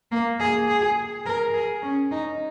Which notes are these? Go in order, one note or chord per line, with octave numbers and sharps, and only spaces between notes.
A#3
G#4
G#4
A#4
G#4
C#4
D#4